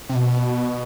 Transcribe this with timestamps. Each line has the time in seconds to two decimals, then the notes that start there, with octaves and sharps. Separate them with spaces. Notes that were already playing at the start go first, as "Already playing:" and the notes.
0.09 C3
0.15 B2